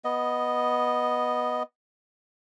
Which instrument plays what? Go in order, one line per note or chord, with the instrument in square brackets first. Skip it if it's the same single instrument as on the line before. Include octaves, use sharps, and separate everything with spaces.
[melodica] B3 D#5